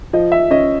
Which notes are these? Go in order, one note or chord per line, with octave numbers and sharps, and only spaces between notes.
F3 D#5
E5
C#4 D#5